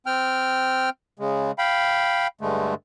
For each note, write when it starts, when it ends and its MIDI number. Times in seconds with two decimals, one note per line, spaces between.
0.06 0.90 60
0.06 0.90 79
0.06 0.90 89
1.19 1.52 49
1.19 1.52 56
1.59 2.27 77
1.59 2.27 79
1.59 2.27 83
2.41 2.74 43
2.41 2.74 50
2.41 2.74 56
2.41 2.74 57